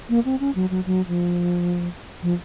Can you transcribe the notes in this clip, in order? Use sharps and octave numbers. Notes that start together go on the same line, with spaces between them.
A#3
C4
C#4
F#3
F#3
F#3
F3
F3